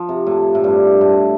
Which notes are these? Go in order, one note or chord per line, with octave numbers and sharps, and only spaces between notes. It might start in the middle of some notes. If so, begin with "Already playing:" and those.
Already playing: F3
C3
A2
A2
G2
A2